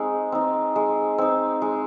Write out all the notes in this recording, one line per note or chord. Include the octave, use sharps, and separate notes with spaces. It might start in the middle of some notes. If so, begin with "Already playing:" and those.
Already playing: G#3 C4 D#4
C4 D#4
G#3
C4 D#4
G#3